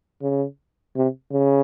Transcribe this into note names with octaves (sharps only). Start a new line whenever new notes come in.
C#3
C3
C#3